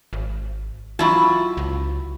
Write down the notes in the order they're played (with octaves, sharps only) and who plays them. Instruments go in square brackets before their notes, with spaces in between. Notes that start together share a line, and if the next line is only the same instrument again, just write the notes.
[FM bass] G#1
[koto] F#3 E4 A5 [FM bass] F4
[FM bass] C#2